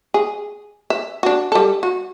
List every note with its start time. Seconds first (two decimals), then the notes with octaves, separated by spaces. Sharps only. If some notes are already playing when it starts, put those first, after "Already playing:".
0.14 G#4
0.90 E5
1.23 D4 F#4
1.52 G3 A4
1.83 F#4